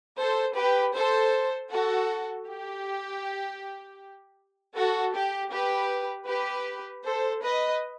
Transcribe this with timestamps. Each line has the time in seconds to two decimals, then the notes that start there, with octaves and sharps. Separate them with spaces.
0.19 A4 C5
0.57 G4 B4
0.95 A4 C5
1.72 F#4 A4
2.48 G4
4.76 F#4 A4
5.15 G4
5.52 G4 B4
6.28 G4 B4
7.05 A4 C5
7.43 B4 D#5